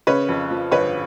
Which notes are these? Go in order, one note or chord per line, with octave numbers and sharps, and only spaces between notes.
C#3 B4 C#5
F2
F3
G1 B4 C#5